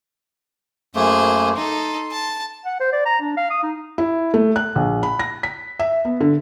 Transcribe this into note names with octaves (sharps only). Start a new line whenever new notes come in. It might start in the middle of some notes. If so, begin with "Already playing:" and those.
F#2 A3 A#3 G#4 C5
D#4 A4 C6
A5
F#5
C5
D5
A#5
D4
F5
D#6
D#4
E4
A3
F#6
A#1
B5
A#6
B6
E5
B3
D3